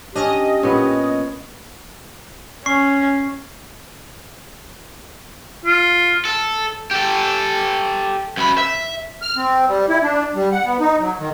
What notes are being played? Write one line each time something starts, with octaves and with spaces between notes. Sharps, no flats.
C#4 D4 G4 D#5
A#2 B3 C#4
C#4 C#6 C7
F4
A4
G4 A4
F#2 B5
E5
F6
C4
G3
E4
D4
G3
F#5
B3
D#4
F#3
D#3